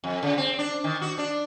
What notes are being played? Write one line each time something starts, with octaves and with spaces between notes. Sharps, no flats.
F2
C#3
C4
D4
D#3
F#4
D4